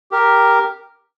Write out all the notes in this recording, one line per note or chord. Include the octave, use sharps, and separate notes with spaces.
G4 A#4